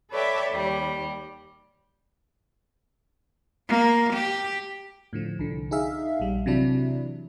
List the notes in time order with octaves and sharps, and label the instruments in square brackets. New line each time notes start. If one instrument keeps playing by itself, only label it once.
[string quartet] A4 B4 C#5 D5 E5 G5
D#2 G3
[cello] A#3
G4
[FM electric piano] A2 D3 F3
C2 D3
D#4 G#4 E5 F5
A#1 G3
C3 E3 F#3 D4 E4